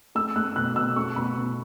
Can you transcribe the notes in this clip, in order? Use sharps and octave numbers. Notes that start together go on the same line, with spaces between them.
A3 E6
A3 F#6
B2 F#6
B2 E6
A3 C#6
B2 B5
B2